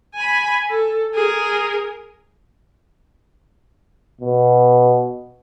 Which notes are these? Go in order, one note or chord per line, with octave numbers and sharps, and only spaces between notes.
G#5 B5
A4
G#4 A#4
B2